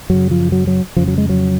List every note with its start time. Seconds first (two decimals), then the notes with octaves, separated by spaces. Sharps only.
0.10 F#2 C#3 F#3
0.31 F3
0.52 F#3
0.67 F#3
0.96 F2 C#3 F3
1.08 F#3
1.18 G#3
1.29 F#3